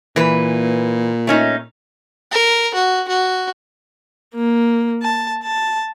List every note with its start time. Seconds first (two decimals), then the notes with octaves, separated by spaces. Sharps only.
0.16 A#2 E3 B4
1.27 A3 C#4 D#4
2.31 A#4
2.74 F#4
3.08 F#4
4.35 A#3
5.03 A5
5.43 A5